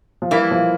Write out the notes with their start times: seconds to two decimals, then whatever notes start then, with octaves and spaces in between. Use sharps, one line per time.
0.22 F3
0.31 E3 G3 A#3 E4
0.51 F3